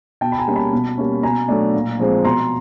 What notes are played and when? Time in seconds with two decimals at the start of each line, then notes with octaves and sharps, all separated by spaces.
0.21 B2 G5 A5
0.32 B5
0.39 G#5 A#5
0.48 G3 A#3 C#4
0.55 A5 B5
0.73 B2
0.98 G3 A#3 C#4
1.23 B2 G#5 A#5
1.48 F#3 A3 D4
1.74 A#2
1.99 F3 G#3 C4
2.24 B2 A#5 C6